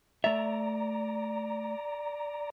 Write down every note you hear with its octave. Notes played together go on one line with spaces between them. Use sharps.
A3 D5 E5 A#5